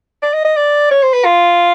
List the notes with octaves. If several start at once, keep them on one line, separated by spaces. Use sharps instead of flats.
D5
D#5
D#5
D5
C#5
C5
B4
F4